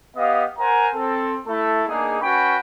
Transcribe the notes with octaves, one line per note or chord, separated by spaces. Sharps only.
B3 G4 D#5 F5
A#4 C5 F#5 G#5 A#5
C4 A4
A3 E4 A4
A#3 B3 D4 D#4 G#4
C#4 F#4 B4 G5 B5 C#6